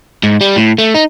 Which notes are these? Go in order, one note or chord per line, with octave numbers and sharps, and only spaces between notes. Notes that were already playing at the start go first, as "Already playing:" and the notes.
G#2
G3
A2
A3
D#4